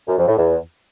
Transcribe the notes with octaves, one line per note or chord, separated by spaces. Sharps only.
F#2
F2
A2
E2